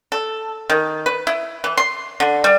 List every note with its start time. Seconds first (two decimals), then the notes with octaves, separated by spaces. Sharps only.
0.12 A4
0.70 D#3
1.06 B4
1.27 E4
1.64 E3
1.77 C6
2.20 D3
2.44 G3